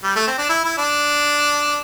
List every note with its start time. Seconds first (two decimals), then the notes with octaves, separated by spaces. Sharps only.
0.04 G3
0.16 A3
0.27 C4
0.38 D4
0.49 E4
0.65 E4
0.78 D4